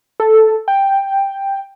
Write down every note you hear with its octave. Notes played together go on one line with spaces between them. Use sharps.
A4
G5